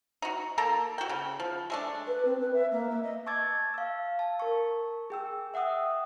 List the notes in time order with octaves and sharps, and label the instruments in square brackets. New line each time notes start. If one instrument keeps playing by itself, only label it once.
[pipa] D#4 F#4
A#3 A4 A#5
F#4 G5
C#3
F3
G#3 A3 D4
[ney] B4
C4
B4
E5
A#3
E5
D#5
[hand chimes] A5 C#6 D6 E6 G#6 A6
F5 E6
A5
A#4 C#6
G#4 G5 E6
E5 F#5 G5 D#6 E6